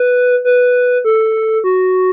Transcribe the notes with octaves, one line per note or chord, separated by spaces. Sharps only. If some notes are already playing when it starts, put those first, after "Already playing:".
Already playing: B4
B4
A4
F#4